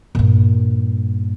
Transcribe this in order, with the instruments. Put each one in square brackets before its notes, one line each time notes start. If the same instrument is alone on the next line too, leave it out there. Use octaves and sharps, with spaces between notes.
[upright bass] G2 A#2